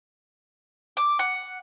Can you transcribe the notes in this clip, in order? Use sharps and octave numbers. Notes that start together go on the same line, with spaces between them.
D6
F#5